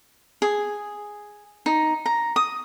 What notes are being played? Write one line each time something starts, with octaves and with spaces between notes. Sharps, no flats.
G#4
D#4
A#5
D#6